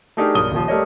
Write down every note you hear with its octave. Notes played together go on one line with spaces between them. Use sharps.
A3 D4 D#4 G4 G#4 A#4
B1 G2 A#4 D#6 G7
D#1 D#2 F3
G3 A3 A#4 C#5 D#5